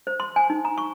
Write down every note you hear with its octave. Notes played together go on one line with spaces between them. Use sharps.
C5
C6
G#5
D#4
A#5
C#6